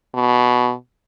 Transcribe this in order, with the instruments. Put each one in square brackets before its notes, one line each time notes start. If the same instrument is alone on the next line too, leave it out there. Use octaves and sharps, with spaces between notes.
[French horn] B2